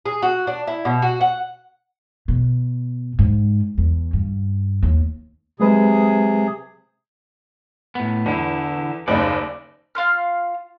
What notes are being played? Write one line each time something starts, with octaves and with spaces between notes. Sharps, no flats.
G#4
F#4
D4
E4
B2
F#4
F#5
B2
G#2
E2
G2
D#2
C3 F#3 G#3 G#4 B4
A2 B3
E2 D3 E4
F#1 D#2 C#3 D5
F4 F5 C6 F6